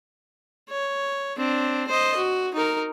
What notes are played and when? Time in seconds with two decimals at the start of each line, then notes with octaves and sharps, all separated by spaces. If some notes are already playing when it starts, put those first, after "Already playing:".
0.69 C#5
1.37 C4 D4
1.88 C5 D#5
2.16 F#4
2.54 D#4 A#4